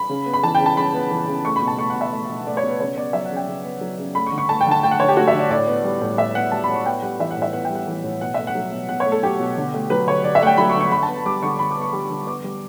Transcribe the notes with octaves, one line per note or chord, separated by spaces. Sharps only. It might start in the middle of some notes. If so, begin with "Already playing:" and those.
Already playing: B5
C#3
B3
B5
E3 A5
G5
C#3
A5
C#3 B5
B3
E3
C#3
A3 C#6
B5
B2
A5
A3 C#6
F#5
B2
E5
A3
B2
A3 D5
C#5
B2
B4
C#3 C#5
B3 D5
F#3 E5
F#5
C#3
G5
C#3
B3
F#3
C#3
A3 B5
C#6
D3
C#6
A3 A5
G5
D3
A5
A3 G5
F#5
D3 C#5
G4
A3 F#4
E5
D3
D5
A2 D5
B3
G3
A2
A2 E5
B3 F#5
G3 A5
B5
A2
C#6
B3 G5
G3 F#5
E3 E5
F#5
A2
E5
B3 F#5
G5
G3
F#5
E3
A2
B2 F#5
A3 E5
F#5
F#3
B2
B2 F#5
C#5
A3
A4
F#3 G4
B2
D3
A3
F#3 B4
D3 C#5
D3 D5
E5
A3 F#5
G5
F#3 B5
C#6
D3
C#6
D3 B5
A5
B3
G3 D6
D3 C#6
D3 B5
D6
B3 C#6
G3
D3
B3 D6
G3